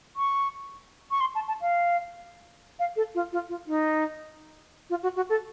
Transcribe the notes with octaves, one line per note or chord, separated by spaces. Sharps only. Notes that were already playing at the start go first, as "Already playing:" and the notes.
C#6
C#6
C6
A5
A5
F5
F5
A4
F4
F4
F4
D#4
F4
F#4
F#4
A4